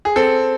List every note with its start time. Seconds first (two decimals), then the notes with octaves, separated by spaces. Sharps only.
0.05 G#4
0.16 C4 A4